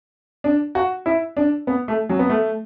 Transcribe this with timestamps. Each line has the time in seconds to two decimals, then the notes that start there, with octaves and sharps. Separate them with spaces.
0.44 D4
0.75 F#4
1.06 E4
1.37 D4
1.67 B3
1.88 A3
2.09 F#3
2.19 B3
2.30 A3